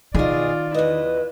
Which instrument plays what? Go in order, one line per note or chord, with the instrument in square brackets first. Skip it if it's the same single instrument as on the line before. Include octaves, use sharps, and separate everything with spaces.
[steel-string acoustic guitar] B2 G#4 [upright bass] D#3 [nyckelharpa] F4 D5
[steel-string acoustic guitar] E2 D#5 [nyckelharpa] E4 [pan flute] B4